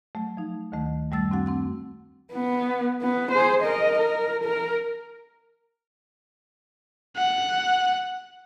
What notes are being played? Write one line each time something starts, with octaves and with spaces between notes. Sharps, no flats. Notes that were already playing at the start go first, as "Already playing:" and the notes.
F#3 A3
F3 D#4
D2 D#3 A3
F#2 G3 A3 E6 A6
C4 D4 F#4 F#5
C4 F#5 E6
B3
B3
G#4 C5
A#4 D#5
A#4
A#4
F#5